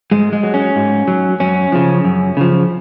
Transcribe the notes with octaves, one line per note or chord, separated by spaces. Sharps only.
G#2 G#3
G#3
F#3
C#4
G#2
F#3
F#2 C#4
C#3 F3
F#2
C#3 F3